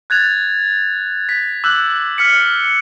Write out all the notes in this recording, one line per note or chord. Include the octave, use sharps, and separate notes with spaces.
F#6 G#6 A6 F7
B6
D6 E6 F#6 G6 F#7
F6 B6 C#7